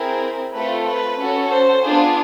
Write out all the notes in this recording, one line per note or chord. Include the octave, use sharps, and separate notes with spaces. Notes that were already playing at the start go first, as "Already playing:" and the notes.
Already playing: C4 E4 G#4 A#4
A3 C4 F4 A4 B4
B4
C#4 F#4 A4
C5
B3 D4 F4 G#4